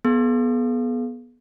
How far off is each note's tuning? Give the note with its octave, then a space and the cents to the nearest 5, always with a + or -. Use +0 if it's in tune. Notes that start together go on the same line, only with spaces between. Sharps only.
B3 -15 G#4 +40